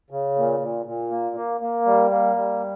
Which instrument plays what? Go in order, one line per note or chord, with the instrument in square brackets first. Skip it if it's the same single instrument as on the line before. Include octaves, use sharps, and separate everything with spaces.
[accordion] C#3
A#2
A#2
A#2
A#3
A#3
A#3
G3
A#3
G3